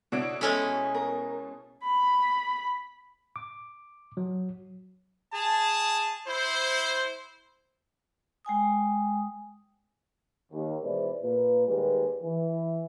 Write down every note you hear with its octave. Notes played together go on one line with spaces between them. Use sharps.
B2 D4 E4 F#4 C#5 D7
G#3 C#4 E4 A4
A#4
B5
D6
F#3
G#4 A5
E4 C5
G#3 G5 G#5 D#6
D#2
B2 E3 G#3 B4 C5 D5
A#2 B4
D#2 G3 G#3 A#3 B4
E3